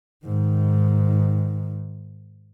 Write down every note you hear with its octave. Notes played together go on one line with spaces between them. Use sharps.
G#2 D#3